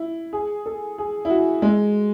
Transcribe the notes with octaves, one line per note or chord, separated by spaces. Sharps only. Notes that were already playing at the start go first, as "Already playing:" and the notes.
Already playing: E4
G#4
A4
G#4
E4
F#4
G#3